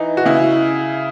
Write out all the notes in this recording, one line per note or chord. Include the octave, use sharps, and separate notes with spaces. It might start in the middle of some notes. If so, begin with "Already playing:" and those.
Already playing: E3 D#4
F#4
C#3 E4